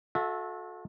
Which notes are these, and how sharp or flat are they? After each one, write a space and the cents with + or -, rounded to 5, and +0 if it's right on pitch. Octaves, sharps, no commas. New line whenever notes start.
F#4 -40 A4 -15 E5 +0